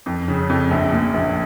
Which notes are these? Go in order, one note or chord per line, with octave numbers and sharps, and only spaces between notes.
F2
C#3
F2
A#1
A#2
A#1